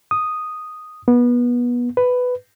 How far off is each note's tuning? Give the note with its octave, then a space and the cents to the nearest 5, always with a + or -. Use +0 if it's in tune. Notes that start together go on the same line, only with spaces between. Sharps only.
D#6 -5
B3 -25
B4 +10